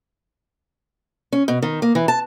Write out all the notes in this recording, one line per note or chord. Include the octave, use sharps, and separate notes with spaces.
C#4
B2
D#3
A#3
E3
A5